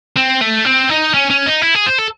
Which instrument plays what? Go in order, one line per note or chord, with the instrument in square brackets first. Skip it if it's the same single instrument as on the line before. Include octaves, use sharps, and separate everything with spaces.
[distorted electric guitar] C4
A3
C4
D#4
C#4
C#4
D#4
E4
G#4
C5
A4